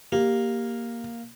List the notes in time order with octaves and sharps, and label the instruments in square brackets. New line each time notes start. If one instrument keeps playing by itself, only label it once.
[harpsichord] A#3 [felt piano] G4